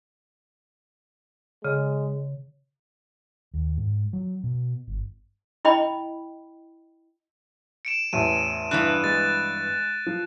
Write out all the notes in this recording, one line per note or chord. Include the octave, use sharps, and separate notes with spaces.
C#3 G#3
D#2
G#2
F#3
B2
G1
E4 D#5 G5 B5
C#7 D7 E7
A1 E2 D#7
G2 E3 B3 F#6
G#3 A6
F3